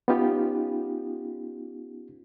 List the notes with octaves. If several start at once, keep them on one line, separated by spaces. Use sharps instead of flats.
B3 C#4 D#4 F4 G4